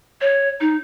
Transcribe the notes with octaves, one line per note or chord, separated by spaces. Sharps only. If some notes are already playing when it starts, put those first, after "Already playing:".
C#5
D#4